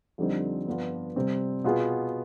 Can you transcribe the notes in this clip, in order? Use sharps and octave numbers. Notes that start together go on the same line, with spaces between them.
F2 D3 G3 C4 D#4
G2 F3 B3 D4 F4
C3 G3 C4
B2 B3 F4 G#4